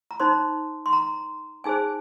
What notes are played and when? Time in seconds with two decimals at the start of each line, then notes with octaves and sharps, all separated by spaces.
0.11 A#5
0.20 D#4 C5 C6
0.86 C6
0.93 A#5
1.64 D#4 G#4 C5 G#5